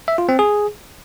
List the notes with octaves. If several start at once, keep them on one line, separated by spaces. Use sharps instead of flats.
E5
F4
C4
G#4